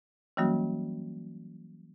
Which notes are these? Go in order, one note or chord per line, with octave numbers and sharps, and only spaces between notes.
E3 F#3 G3 A#3 C#4 F#4